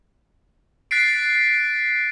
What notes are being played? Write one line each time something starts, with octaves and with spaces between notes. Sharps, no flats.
F#6 A6 B6 C7 D7